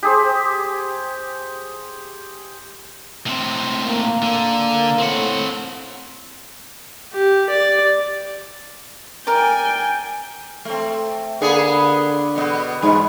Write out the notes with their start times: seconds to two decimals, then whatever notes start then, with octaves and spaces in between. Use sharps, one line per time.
0.03 G4 G#4 C5
3.27 A2 C4
3.86 A#3
4.22 D3
4.99 A2 C4 F#5
7.13 G4
7.49 D5
9.27 A#4 D5 G5 G#5
10.65 A3 C4
11.41 D3 A#3 B3 G#4
12.35 B2 B3
12.82 G#2 F#3 G#3